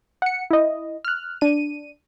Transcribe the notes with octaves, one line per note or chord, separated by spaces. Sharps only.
F#5 C#7
E4 D#5
F6 F#6
D4 D#7